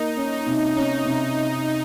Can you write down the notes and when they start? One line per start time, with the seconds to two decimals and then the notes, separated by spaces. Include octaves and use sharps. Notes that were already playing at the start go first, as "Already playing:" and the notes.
Already playing: A#3 D#4
0.17 C#4
0.32 D#4
0.47 C3
0.76 C#4 D#4
1.05 C3